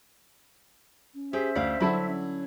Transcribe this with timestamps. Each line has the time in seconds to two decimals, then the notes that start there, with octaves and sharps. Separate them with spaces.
1.14 C#4
1.33 G4 G#4 C5 E5
1.55 D2 D5 F5
1.80 D3 F#3 E4 A5 B5
2.06 C#4